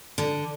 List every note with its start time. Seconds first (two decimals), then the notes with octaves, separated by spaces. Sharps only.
0.18 D3